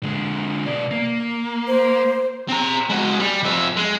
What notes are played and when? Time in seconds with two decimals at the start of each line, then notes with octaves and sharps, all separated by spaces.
0.03 D3 G#3
0.66 B2 D5
0.91 A#3
1.67 C5
2.48 C4 A#5
2.89 G#3 F#4
3.20 G3
3.43 F2 E5
3.77 G#3